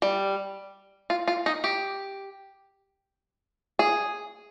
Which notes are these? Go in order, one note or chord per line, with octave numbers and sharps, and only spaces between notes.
G3
F4
F4
D#4
G4
G#4